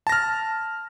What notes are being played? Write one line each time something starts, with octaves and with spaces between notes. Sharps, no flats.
A5 F6 A#6